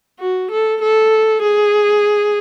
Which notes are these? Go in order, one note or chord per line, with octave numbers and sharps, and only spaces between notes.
F#4
A4
A4
G#4